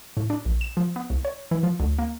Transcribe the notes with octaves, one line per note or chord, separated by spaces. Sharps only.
A2
D4
A#1
E7
F3
B3
C2
C#5
E3
F3
D2
A#3